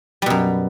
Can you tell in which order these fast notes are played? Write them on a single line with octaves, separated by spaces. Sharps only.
G3 B2 F#2